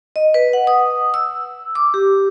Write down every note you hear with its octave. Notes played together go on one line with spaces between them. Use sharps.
D#5
B4
F#5
D#6
E6
D6
G4